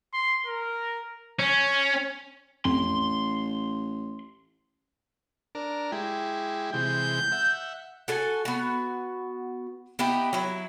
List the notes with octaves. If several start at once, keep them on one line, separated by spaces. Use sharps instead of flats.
C6
A#4
C#4
A1 F2 C6
D4 A#4
G#3 E4 G4
C3 E3 G#3 G6
E5 F#5
F#4 A4 G#5
B3 F#4
B3 D#4 E4 G4
F#3 E4